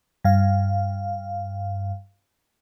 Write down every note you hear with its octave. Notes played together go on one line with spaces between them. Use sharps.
G2 F5